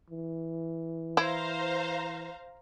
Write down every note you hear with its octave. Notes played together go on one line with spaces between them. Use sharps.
E3
E4 C5 F5 A#5